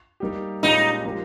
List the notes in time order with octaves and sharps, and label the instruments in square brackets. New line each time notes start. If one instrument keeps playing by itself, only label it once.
[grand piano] G3 A#3 D#4 G4
[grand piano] A#2 G#3 C#4 G4 [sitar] D#4
[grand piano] F3 A#3 D#4 G4